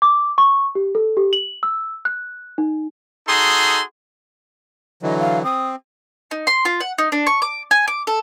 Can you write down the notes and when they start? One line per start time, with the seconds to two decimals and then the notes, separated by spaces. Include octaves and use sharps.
0.02 D6
0.38 C#6
0.75 G4
0.95 A4
1.17 G4
1.33 F#7
1.63 E6
2.05 F#6
2.58 D#4
3.28 D#4 F#4 G#4 A4 C6
5.03 D3 E3 F#3 D#5
5.19 F5
5.44 C4 D#6
6.31 D#4
6.47 C6
6.65 F4
6.80 F#5
6.98 D#4
7.12 D4
7.27 C#6
7.42 D6
7.71 G#5
7.88 D6
8.07 A4